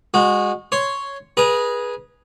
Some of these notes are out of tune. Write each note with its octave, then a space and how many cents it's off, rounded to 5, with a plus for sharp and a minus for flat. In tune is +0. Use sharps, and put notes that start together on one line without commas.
G#3 -25 F#4 -20
C#5 +0 C6 +0
G#4 +0 B4 -25 A#5 +0